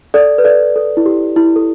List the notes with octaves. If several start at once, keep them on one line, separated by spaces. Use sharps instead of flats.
A4 D5
B4
A4 D5
A4
E4
G4
E4
A4